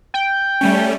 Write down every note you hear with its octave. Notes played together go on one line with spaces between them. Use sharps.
G5
G3 A3 C#4